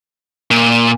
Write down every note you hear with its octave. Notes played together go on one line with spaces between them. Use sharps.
A#2